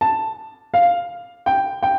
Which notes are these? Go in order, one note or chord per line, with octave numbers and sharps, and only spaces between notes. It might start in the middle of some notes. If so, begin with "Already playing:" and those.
A5
F5
G5
G5